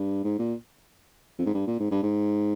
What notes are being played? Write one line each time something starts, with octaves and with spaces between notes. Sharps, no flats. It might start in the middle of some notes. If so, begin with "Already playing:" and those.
Already playing: G2
G#2
A#2
F2
G#2
G2
A#2
G#2
G2
G#2